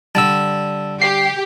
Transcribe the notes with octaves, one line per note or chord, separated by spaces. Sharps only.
D3 G3 A5 E6
G4 C7